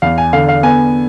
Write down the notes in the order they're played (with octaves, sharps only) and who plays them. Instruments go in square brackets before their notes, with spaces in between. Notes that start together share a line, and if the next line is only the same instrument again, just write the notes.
[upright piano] E2 [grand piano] F5
[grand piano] G#5
[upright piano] D3 [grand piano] F5
[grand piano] F5
[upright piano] B3 [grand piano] G#5